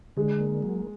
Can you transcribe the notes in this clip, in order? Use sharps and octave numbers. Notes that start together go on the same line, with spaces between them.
D3 G#3
A#3
F#3